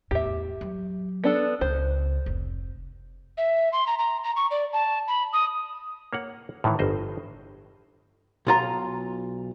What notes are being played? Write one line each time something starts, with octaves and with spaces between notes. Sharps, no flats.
E2 A2 G4 E5
F#3
B3 D4 A4
C#2 C#3 C5
F1
E5
C6
A#5
A#5
A#5
C#6
D5
A5
B5
D#6
A#3 C#5 F#5
A2 D#3 E3
G1 C5 D#5
B1 F4 A#5